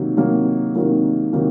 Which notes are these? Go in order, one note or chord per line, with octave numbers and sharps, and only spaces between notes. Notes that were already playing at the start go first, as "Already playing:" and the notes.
Already playing: C3 D#3 F#3 A#3
C3 D#3 F#3 A#3
C3 D#3 F#3 A#3
C3 D#3 F#3 A#3